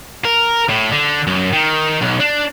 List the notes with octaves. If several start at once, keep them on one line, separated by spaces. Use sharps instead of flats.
A#4
A2
D3
F#2
D#3
B1
D4